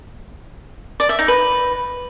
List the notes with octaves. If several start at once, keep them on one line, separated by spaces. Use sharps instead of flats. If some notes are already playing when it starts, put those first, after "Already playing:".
D5
E5
D#4
B4